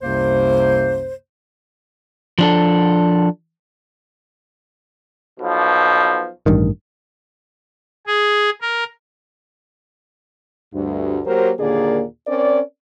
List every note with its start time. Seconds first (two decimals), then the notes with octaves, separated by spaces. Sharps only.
0.02 C2 F#2 C3 A#3 C5
2.39 F3 D4 A4
5.40 B1 B2 F3
6.46 A1 G2 D#3
8.07 G#4
8.62 A#4
10.74 D2 G2
11.26 F#3 A#3 G4 A#4 C5
11.59 D#2 A#2 D3 A#3 G#4 D5
12.27 C4 C#4 A#4 D5